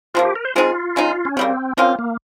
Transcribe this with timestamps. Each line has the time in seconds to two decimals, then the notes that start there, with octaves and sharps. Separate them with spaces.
0.14 C3 F3 A#3 F4
0.25 G4
0.35 A#4
0.45 C5
0.55 G#3 C4 D#4 F4 G#4
0.96 C#3 G#3 D#4
1.25 C#4
1.37 C#3 G3 A#3 C4
1.77 F3 A#3 C4 C#4 F4
1.99 A#3